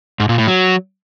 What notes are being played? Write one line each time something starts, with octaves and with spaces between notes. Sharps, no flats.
G#2
A#2
A2
F#3